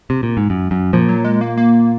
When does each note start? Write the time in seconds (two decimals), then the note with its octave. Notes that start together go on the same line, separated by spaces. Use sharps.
0.10 C3
0.23 A#2
0.37 G#2
0.50 F#2
0.71 F#2
0.93 A#2 F3
1.09 F#3
1.25 G#3
1.41 A#3
1.57 A#3